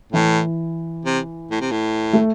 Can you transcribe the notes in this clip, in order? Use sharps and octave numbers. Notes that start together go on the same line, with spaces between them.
A2 E3
C3
A2
C3
A2
A3